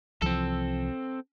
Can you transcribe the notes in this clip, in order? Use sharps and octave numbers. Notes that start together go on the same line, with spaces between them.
C2 E3 F3 C4 A4